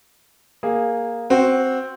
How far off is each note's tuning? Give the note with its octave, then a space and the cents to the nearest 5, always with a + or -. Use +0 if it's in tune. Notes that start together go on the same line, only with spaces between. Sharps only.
A#3 +0 G#4 -10
C4 +0 F#4 +0